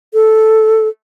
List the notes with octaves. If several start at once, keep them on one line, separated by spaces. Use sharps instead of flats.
A4